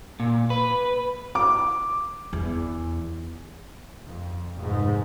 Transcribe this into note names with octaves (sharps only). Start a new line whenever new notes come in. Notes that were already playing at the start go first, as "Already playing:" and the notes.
A#2
B4
D6
E2
F2
F1 G#2